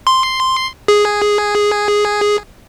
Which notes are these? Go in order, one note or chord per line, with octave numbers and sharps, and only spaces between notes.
C6
G#4